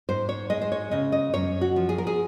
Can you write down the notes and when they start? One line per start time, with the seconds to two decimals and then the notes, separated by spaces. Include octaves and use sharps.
0.09 G#2 C5
0.29 C#5
0.50 G#3 D#5
0.62 C5
0.72 C#5
0.91 C#3 D#5
1.12 D#5
1.33 F#2 C#5
1.61 F#4
1.76 F3
1.89 G#4
1.98 A#4
2.07 G#4